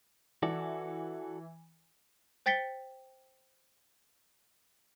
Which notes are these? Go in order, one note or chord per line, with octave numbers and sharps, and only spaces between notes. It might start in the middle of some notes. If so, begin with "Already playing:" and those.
E3 F#4 A4 D5
C5 G5 A6 B6 C#7 G7